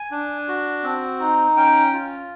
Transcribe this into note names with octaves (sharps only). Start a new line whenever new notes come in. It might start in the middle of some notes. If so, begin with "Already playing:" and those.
Already playing: G#5
D4
F#4
C4
D#4
C#4 G5
F4